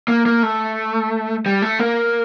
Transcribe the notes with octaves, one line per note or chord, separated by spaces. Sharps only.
A#3
A#3
A3
G3
A3
A#3